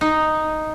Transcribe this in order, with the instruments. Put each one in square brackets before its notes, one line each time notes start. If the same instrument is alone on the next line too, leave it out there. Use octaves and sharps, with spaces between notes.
[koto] D#4